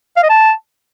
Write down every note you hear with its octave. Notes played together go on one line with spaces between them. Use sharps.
F5
D#5
A5